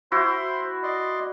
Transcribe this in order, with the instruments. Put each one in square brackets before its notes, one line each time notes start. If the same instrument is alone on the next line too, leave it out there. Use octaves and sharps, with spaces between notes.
[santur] E4 F#4 [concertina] C5 C6
[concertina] D5 D#5 C6